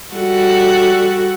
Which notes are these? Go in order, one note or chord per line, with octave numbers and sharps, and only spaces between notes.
G3 F#4 A4